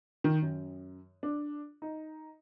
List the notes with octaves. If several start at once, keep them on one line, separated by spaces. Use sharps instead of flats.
D#3
F#2
D4
D#4